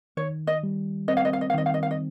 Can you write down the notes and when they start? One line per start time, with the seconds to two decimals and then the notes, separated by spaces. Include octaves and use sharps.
0.17 D#3 C#5
0.47 D#5
0.63 G3
1.08 C4 D#5
1.17 F5
1.25 D#5
1.33 F5
1.41 D#5
1.50 F5
1.54 D#3 D#5
1.66 F5
1.74 D#5
1.83 F5
1.91 D#5